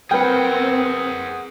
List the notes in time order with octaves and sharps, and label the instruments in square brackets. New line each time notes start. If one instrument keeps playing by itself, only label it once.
[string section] C4 [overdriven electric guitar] G#4 F#5 [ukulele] A#4 B4 [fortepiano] G5